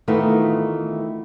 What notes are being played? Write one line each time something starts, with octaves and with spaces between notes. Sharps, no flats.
D#3 E3 A3 B3 F4